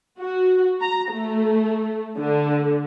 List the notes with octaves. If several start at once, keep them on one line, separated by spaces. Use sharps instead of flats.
F#4
A#5
A3
D3